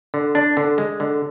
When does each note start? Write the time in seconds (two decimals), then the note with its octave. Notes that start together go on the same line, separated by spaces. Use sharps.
0.14 D3
0.35 D4
0.57 D3
0.78 G#3
1.00 D3